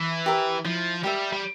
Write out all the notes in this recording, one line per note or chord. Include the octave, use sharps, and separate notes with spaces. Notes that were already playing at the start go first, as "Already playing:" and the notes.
Already playing: E3
G4 A#4 E5
F3 E4
G3 G4 A#4 E5
G3